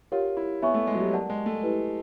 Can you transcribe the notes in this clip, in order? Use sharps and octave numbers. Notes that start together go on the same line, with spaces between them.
F4 G4 A#4 C#5 F#5
E4
B3 C#5 E5 G#5 C#6
A3
G#3
F#3
G3
A#4 D5 F#5 A5
G#3
A3
E4 G4 B4